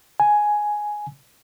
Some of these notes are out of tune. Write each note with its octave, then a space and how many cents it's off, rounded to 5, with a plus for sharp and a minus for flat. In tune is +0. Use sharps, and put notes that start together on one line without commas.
G#5 +5